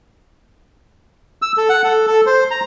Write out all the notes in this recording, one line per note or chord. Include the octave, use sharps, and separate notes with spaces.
E6
A4
F#5
A4
A4
C5
A#5